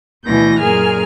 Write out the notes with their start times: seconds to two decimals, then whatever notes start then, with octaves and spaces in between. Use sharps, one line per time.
0.23 D2 B2 E3 G6 A#6
0.59 F#2 A#2 G#4 A#4 G#5 F6